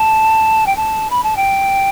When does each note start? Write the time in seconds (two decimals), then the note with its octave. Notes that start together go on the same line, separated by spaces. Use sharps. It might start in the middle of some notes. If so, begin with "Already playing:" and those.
Already playing: A5
0.66 G5
0.76 A5
1.10 B5
1.23 A5
1.36 G5